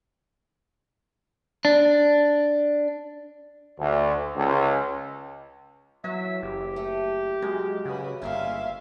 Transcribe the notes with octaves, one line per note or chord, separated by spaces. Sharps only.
D4
D2
C#2
E3 F#3 E5
F#1 G4
A3
F#2 G#3
C#3 F#4 B4
G1 G#3 A#3 C#4 E5 F5